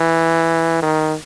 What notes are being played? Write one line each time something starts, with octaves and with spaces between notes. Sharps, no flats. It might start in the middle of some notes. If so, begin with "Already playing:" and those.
Already playing: E3
D#3